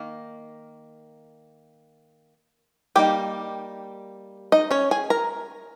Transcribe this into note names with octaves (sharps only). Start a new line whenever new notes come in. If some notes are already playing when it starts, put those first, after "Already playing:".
Already playing: D#3 A#3
G3 A#3 D#4 G4 G5
D#4 D#5
C#4 C#5
G#4 G#5
A#4 A#5